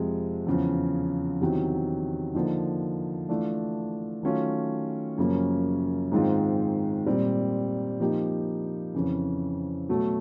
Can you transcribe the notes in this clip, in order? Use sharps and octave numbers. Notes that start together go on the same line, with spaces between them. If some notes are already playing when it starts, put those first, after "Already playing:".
Already playing: F2 C3 F3 G#3 C4
E2 C#3 F3
E2 C3 D#3 F#3
D3 F3 A#3 D#4
E3 A3 D4 F4
D#3 F#3 A3 C#4 F4
F#2 C#3 F3 A#3
G#2 D#3 G#3 C4 F4
A#2 G3 C4
F3 A#3 D#4 G4
F2 C#3 E3
B2 F#3 A3